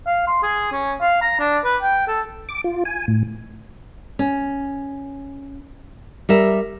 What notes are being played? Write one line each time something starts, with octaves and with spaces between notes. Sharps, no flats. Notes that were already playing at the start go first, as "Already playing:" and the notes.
F5
C6
G#4
C#4
F5
A#5
D4
B4
G5
A4
D6
F4
G#5
A2
C#4
G3 A#4 E5